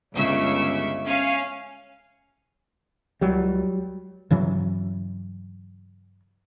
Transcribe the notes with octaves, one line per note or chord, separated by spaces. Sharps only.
G1 C#2 C#3 E5 C#6
C#4 F5 G#5
C#2 F#3 G3
G2 C#3 E3 F#3